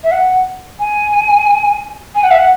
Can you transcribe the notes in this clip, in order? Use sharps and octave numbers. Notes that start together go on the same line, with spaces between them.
E5
F#5
G#5
G#5
F#5
E5
F#5